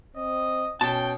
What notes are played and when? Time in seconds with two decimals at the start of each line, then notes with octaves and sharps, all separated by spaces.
0.16 C4 D#5
0.81 B2 C#4 G5 A5